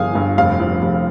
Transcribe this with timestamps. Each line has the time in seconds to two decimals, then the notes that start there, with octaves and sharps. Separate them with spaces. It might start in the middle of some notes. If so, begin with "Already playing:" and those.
Already playing: G1 G2 F3 F5 G#5 D#6
0.15 G2
0.38 F1 F5
0.60 F3
0.82 F1